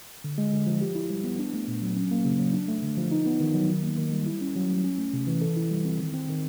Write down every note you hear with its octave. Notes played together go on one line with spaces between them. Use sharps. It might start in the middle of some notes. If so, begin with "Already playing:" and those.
D3
G#3
D3
F3
G4
E4
G3
B3
D4
A3
A#2
F#3
C#4
A#3
C#3
F#3
D4
A3
D3
F3
D#4
B3
D#3
F#3
D#3
A#3
D#3
G3
E4
C#4
F#3
A3
C#4
A3
C3
E3
A4
E4
G3
C4
D#3
C4
D#3